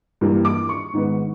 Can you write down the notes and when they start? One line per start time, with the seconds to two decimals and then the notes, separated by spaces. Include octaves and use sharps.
0.21 G2 E3 G3 A#3
0.45 D6
0.69 C#6
0.93 G#2 D#3 G#3 B3